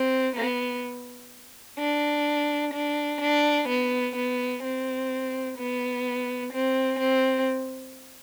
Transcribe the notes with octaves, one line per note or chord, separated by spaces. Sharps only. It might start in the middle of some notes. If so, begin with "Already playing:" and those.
Already playing: C4
B3
D4
D4
D4
B3
B3
C4
B3
C4
C4